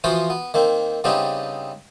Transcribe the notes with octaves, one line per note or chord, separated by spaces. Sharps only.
E3 F3 B3 F4 F#4 C5
B3
D#3 A#3 C4
C#3 G3 B3 C4 D4 D#4